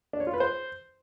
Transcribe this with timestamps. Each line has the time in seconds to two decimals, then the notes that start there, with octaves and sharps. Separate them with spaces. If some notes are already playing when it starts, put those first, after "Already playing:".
0.13 D4
0.20 C#5
0.27 F4
0.34 B4
0.40 C5